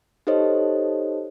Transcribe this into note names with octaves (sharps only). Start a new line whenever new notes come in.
D#4 G4 A4 C5 C#5 D#5